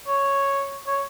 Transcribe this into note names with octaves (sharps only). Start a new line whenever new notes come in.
C#5
C#5